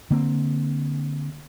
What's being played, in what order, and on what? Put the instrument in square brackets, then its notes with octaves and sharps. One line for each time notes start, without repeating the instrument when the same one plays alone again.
[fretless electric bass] D3 A#3 C4